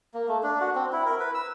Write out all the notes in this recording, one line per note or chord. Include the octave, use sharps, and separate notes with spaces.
A#3
A3
D4
F#4
C4
E4
A#4
B4
E6